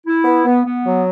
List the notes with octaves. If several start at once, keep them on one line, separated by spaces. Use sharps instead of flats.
E4
B3
B3
B3
F#3